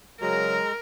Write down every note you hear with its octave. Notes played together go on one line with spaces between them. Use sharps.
C#3 F#3 G#3 A#4 A#5